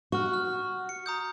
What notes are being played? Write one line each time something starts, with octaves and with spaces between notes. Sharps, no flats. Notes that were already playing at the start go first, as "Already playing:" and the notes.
F#4 C#6 F6
F6
C#7
A#5 D#6 G6